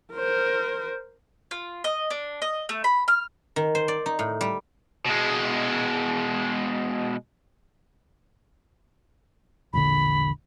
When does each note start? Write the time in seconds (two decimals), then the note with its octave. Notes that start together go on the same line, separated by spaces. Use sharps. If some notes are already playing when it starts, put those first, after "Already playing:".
0.13 A#4 C5
1.51 F4
1.84 D#5
2.10 D4
2.42 D#5
2.69 A3
2.84 B5
3.08 F6
3.56 D#3
3.75 C5
3.88 D5
4.06 D#4
4.19 A2
4.41 G3
5.06 B2 G#3
9.73 E1 A#1 D3 B5